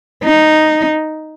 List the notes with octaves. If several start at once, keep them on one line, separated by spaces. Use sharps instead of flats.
D#4